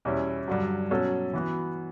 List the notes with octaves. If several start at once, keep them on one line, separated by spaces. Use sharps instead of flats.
E2 B2 G3 C#4 E4
G2 D3 F#3
B2 F#3 C#4 F#4 A4
E3 B3 F#4